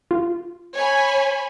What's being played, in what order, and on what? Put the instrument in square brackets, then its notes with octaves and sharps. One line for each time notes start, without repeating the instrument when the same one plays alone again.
[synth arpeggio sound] F4
[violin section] C#5 G#5 B5